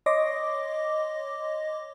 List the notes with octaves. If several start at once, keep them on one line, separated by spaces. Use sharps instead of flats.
C#5 D#5 C6 D6 A#6